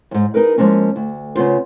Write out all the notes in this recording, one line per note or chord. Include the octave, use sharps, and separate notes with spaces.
F2 G#2
D#4 G#4 A#4 B4
F3 F#3 G#3 A#3 C#4
D2
C#3 B3 F4 C5